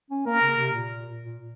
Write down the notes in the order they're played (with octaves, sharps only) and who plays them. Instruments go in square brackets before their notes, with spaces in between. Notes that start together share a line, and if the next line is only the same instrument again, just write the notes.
[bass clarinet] C#4
[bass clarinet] A#3 [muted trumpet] A#4
[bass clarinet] C#3
C3
A#2
A#2